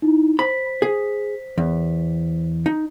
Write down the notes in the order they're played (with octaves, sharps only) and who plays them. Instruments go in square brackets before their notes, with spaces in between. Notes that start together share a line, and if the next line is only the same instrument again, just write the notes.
[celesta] D#4 E4
[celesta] C5 B6 [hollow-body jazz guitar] B5
[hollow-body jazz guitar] G#4
E2
D#4